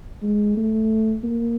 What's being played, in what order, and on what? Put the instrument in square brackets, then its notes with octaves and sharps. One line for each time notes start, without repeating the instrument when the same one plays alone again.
[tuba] G#3
A3
A#3